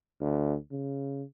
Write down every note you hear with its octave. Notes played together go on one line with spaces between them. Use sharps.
D2
C#3